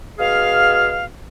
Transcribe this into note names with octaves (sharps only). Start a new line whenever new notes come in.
B2 G#4 F5